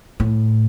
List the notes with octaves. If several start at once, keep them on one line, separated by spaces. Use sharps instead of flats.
A2